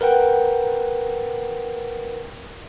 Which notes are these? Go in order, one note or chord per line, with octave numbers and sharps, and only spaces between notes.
A#4 B4 F#5 G5